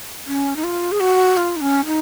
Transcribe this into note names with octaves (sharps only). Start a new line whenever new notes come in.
C#4
D#4
F4
G#4
F#4
F4
D#4
C#4
D#4